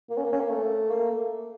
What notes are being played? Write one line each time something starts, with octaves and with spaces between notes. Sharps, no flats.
A#3
C#4
A#3
C#4
A#3
A3
A#3